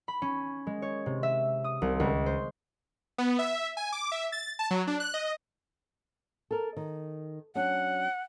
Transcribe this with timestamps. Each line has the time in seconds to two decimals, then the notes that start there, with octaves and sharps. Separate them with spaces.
0.08 B5
0.22 C#4
0.67 G#3
0.82 C#5
1.06 C3
1.23 E5
1.64 D#6
1.82 C2
2.00 C#2
2.26 C5
3.18 B3
3.39 E5
3.77 G#5
3.92 D6
4.12 E5
4.32 A6
4.59 A5
4.71 F#3
4.87 D4
5.00 F#6
5.14 D#5
6.51 A4 A#4
6.77 D#3
7.55 F#3 C#4 D4 F#5